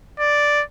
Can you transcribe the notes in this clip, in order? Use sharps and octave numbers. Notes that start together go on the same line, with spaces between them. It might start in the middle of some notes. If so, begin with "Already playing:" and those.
D5